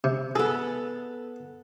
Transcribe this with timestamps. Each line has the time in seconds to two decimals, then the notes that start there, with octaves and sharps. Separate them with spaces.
0.04 C3
0.36 B3 G#4 A4